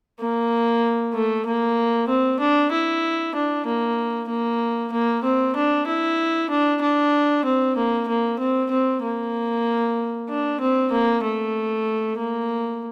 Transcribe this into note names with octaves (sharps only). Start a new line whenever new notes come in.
A#3
A3
A#3
C4
D4
E4
D4
A#3
A#3
A#3
C4
D4
E4
D4
D4
C4
A#3
A#3
C4
C4
A#3
D4
C4
A#3
A3
A#3